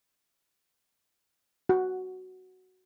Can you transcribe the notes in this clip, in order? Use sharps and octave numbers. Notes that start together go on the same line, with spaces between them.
F#4